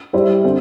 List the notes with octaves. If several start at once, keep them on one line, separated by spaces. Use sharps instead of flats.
G3 E4 C5 E5
D3 C4